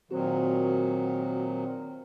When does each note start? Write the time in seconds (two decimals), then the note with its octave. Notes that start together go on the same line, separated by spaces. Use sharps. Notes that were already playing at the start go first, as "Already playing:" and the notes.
0.11 A#2 D#3 F#3 C4 F#4 C5